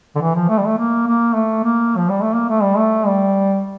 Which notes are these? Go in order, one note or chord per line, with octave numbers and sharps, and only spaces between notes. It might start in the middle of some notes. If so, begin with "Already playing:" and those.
D3
E3
F3
A3
G3
A3
A#3
A#3
A3
A#3
F3
G3
A3
A#3
A3
G3
A3
G3